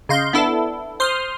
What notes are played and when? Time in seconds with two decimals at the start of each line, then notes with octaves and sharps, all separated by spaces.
0.09 C#3 D#5 F5 C6 G6
0.33 B3 D4 E4 A4
1.00 C5 C6 D#6 F6